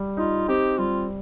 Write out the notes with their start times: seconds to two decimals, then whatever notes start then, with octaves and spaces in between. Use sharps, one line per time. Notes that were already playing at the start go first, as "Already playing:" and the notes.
Already playing: G3
0.17 D#4 F4
0.48 C4 G4
0.78 G3 F4